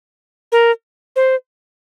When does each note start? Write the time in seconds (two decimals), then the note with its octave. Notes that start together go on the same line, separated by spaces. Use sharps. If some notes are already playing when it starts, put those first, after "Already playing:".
0.52 A#4
1.16 C5